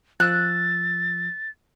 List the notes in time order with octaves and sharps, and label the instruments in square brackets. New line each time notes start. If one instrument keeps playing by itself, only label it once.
[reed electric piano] F3 E6 [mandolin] F#6 [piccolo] A6